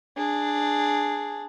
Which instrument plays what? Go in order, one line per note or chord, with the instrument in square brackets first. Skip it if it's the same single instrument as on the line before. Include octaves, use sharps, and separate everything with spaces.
[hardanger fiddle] D4 G#4